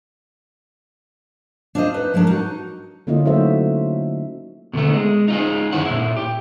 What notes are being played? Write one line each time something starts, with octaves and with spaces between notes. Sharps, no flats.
D4 F4 C5 D5 D#5
D#4 B4
F3 G#3 C#4 D4 A#4
D#4 F#4
D3 A#3 C#4 E4 F4 D#5
F#3 A3 D#4 F#4 C5 E5
B2 D3 D#3 A3
G#3
D#4 F4 G#4
F#2 D#3 E4 C#5 F#5
A#2 E4
G4